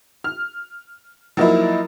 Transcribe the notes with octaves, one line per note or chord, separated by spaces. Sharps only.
F6
F3 F#3 A#3 D#4 E4